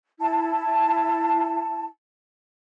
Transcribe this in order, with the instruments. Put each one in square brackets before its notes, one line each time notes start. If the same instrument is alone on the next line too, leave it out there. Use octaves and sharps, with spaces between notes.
[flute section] E4 A5